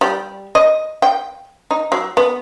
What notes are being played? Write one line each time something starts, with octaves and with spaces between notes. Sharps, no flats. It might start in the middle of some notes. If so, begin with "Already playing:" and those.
G3
D#5
G5
D#4
F#3
B3